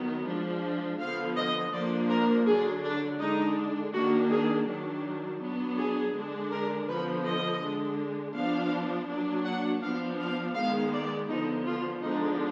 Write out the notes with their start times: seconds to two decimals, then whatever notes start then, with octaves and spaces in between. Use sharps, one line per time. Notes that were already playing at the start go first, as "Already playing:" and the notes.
Already playing: D#3 F#3 B3
0.26 F3 G#3 D4
0.99 D3 F3 B3 F5
1.37 D#5
1.73 F3 A#3 D4 D5
2.09 A#4
2.46 D3 F#3 D4 G#4
2.83 D4
3.20 D3 G#3 D4 D#4
3.94 D#3 A#3 D4 F#4
4.31 G#4
4.67 D#3 F#3 D4
5.41 F#3 B3 D4
5.78 G#4
6.15 D3 G#3 D4
6.52 A#4
6.88 D3 F3 B3 B4
7.24 D#5
7.62 D3 G#3 D4
8.35 F3 B3 D4 F5
9.09 F#3 A#3 D4
9.45 F#5
9.83 F3 B3 D4 F5
10.20 F5
10.55 D#3 G#3 B3 F5
10.93 D5
11.29 D3 F3 B3 D#4
11.67 F4
12.02 D3 F3 G#3 B3 D4 D#4